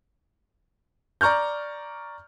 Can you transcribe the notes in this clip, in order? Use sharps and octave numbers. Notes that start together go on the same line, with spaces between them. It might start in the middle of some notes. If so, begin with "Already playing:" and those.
D5 A#5 C#6 F6 G6